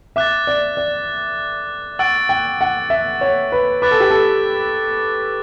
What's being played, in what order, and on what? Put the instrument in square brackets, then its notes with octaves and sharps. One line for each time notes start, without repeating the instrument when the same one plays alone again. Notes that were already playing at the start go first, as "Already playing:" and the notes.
[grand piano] E5 [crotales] D6 F#6 A6
[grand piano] D5
D5
[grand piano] F#5 [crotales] C#6 E6 A6 D7
[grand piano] G5
F#5
E5
C#5
B4
[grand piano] B4 [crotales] D6 F#6 A6
[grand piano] A4
G4
A4